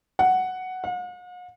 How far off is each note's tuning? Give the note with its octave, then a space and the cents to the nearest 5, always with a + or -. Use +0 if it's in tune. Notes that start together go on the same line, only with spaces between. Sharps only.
F#5 +5
F#5 -45